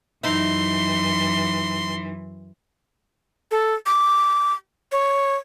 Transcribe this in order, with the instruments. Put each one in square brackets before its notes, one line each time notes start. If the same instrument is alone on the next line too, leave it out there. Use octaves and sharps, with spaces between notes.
[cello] F#2 E3 [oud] D#4 E4 [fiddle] C6
[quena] A4
D6
C#5